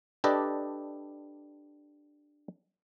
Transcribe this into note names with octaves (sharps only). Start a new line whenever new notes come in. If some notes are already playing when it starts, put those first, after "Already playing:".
D4 G4 A4 B4 D5 D#5